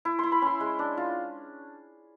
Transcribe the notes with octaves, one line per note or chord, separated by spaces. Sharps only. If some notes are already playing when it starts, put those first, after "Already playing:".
E4
E4 C6
B5
C#4 C6
G#3
D4
F4